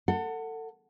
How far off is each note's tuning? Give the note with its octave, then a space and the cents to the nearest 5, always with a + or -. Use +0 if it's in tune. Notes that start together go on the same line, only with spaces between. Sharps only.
A4 +30 F#5 +0